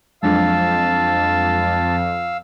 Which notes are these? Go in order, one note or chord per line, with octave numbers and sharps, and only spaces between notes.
F2 F#3 G#3 D4 F5 A5 E6